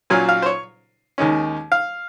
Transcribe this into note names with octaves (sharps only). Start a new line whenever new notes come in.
A#2 F#3 C#4 F4 G#5
F5
C5
C#5
D#2 D#3 G#3 C#4
F5